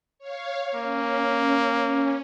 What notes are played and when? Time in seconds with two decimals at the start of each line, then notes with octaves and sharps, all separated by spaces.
0.19 C#5 F5
0.75 A#3 C#4